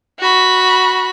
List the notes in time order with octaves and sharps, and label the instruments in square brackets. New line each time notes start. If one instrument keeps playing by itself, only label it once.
[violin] F#4 B5